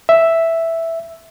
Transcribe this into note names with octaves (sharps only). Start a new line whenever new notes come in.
E5